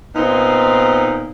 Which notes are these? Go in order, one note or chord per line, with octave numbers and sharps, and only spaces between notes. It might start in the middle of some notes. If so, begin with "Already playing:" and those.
A#2 B3 C4 D#4